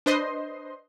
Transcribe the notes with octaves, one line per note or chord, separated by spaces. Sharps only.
D4 B4 C5 D#5 C6